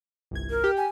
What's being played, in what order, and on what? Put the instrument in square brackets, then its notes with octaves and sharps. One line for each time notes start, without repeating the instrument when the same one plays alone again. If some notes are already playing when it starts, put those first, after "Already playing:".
[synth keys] G1 C2 G#6
[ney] A#4
[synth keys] G4
[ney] G#5